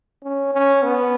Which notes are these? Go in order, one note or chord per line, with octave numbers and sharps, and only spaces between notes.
C#4
C#4
B3